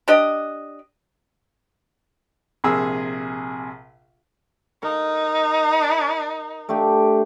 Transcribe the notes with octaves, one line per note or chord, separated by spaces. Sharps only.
D4 G4 D#5
A#1 C3 G#4 A#4 E6
D#4 A#4
A3 D4 G4